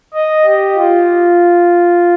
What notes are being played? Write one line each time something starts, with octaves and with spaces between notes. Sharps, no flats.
D#5
G4
F4